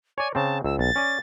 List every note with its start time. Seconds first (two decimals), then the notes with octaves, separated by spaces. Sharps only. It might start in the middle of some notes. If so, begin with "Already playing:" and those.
0.18 C#5 D5 G#5
0.35 C#3 C4 A5
0.64 C#2 E6
0.79 B1 A6
0.96 C#4 D5 G#5